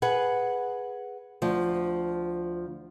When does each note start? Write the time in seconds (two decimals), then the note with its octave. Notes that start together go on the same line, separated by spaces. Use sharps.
0.02 G#4 B4 F#5
1.42 D2 F3